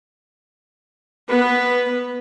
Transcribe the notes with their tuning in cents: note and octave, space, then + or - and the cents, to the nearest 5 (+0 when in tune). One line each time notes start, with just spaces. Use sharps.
B3 -5 B4 +0